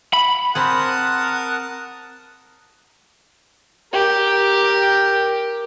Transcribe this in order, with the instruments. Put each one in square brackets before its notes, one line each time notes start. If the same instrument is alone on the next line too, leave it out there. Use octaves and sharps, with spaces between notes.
[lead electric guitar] B5
[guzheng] C4 G#4 [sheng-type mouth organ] A#4 A5 D#6 [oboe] F#5
[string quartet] G4 A#4